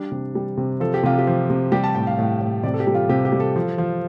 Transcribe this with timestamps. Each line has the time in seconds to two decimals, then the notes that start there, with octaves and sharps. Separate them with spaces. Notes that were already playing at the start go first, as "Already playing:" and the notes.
Already playing: G3 D4
0.11 C3
0.35 G3
0.57 C3
0.80 F3 A4
0.94 G4
1.03 C3 F4
1.18 G4
1.27 F3
1.50 C3
1.72 G3 G4
1.84 A5
1.95 A2 G5
2.07 F5
2.19 A2
2.41 A2
2.63 C3 D5
2.74 A4
2.80 G4
2.87 G3
2.95 F4
3.09 C3 G4
3.25 G4
3.32 G3
3.40 A4
3.56 F3
3.78 F3